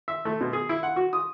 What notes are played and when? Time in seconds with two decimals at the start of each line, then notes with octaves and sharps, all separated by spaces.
0.08 E5
0.25 A3
0.41 B2
0.53 G#4
0.69 E4
0.83 F#5
0.96 F#4
1.13 D#6